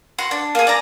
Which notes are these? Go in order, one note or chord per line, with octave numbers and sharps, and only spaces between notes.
F#4 C6
D4
A#3 G#4
D5 A#5